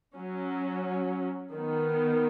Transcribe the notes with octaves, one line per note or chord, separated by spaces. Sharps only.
F#3 C#4
D#3 B3